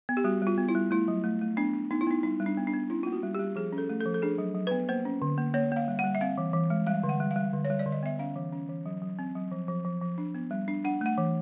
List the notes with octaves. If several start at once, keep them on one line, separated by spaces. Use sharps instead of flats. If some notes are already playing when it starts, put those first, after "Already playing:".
B3
G4
G3 F#4
G3
F4
B3
E4
G3
A3 E4
F#3
A3
A3
B3 D4
D4
B3 D#4
E4
B3 D#4
G3 D#4
G3
D4
B3
D4
B3
C#4 E4
A#3 F4
F#4
G3
G4
G3
F3 G#4
C#4
A4
A3
A4
F3
A4
D4 G#4
F#3
F#3
B3 B4
A#3 C5
C#4
D3
A#3
A#3 C#5
A#3 F5
G3
G3 F#5
E5
C4 F5
E3
E3
G#3
G3 F5
D3
F#5
G3
F5
G3
D3
C#5
G3
D5
D3
D#5
B3 E5
C#4 F5
E3
C#4
E3
F#3
F#3
C4
F#3
F3
F3
F3
F3
D4
B3
G3
D4
D4 F#5
A3 F#5
E3